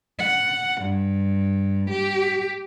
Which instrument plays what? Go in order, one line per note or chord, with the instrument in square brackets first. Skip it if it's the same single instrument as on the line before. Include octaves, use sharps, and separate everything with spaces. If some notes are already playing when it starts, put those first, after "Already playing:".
[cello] F#5
G2
G4